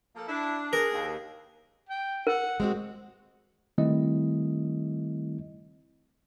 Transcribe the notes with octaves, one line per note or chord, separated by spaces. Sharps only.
F3 A#3 A4
D4 E4
G#4 A#4
D#2
G5
A#4 F#5
G#3 C4 F#4
D#3 G3 A3 C4 E4 D#5